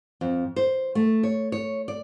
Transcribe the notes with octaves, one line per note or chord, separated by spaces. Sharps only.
F2
C5
A3
C#5
C#5
D5